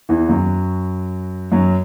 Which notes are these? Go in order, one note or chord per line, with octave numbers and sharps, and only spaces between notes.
E2 E3
F#2 F#3
F#2 F#3